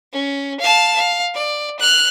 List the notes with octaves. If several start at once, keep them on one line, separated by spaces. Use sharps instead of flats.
C#4
F5 A5
F5
D5
F6 F#6